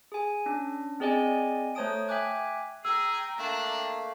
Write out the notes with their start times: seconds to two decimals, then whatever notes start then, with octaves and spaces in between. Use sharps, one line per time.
0.12 G#4 G#5
0.46 C#4 D4
1.00 C4 G#4 D5 D#5 G#5
1.75 A3 C5 C#5 A5 D#6 D7
2.08 E5 G5 G#5 D6 F#6 G#6
2.85 G#4 G5 A#5 E6
3.39 A3 A#3 D4